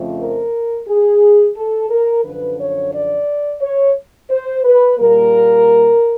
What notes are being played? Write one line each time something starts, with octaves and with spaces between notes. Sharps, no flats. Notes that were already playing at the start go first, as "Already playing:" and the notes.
Already playing: F2 C#3 F3 A3 C4
A#4
G#4
A4
A#4
F#2 D3 F3 B4
C#5
D5
C#5
C5
B4
A#2 G3 A#3 A#4